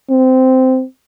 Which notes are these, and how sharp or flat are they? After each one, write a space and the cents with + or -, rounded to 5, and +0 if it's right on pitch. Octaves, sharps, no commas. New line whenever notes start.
C4 -15